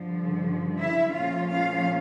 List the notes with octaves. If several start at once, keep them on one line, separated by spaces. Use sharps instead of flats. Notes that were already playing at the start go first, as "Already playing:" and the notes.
Already playing: G2 D3 F3
E4 E5
A#2 F3 A3 C#4 F4 F5
F4 F5